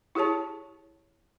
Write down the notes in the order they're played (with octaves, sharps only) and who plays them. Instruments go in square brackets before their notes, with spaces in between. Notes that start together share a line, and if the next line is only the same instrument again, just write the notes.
[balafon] E4 G4 G#4 C#5 A5